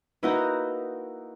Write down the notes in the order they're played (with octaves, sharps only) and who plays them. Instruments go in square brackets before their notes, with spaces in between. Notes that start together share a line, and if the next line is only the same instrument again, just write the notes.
[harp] A#3 E4 B4 [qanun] D#4 F#4 D#5